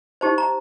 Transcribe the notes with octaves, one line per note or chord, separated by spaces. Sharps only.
D#4 G4 C5 A5
A#5